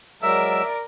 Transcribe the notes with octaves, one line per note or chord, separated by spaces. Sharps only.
F#3 G#3 A#4 D5 E5 E6